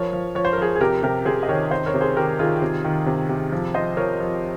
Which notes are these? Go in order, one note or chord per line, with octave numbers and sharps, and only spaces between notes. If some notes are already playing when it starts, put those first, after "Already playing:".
Already playing: F3 A#4 C#5
F3
F3 C#5
C5
A#4
F3 G#4 C5
G#4
C3 G4 A#4
C3 G4 A#4
C3 G#4 C5
D#5
D#3 A#4 C#5
C3 C5 D#5
A#4 C#5
C3
G#4 C5
D#3 G4 A#4
D#3 F4 G#4
C3
D#3
C3
C3
F3
F3 C5 D#5
F3 A#4 C#5
F3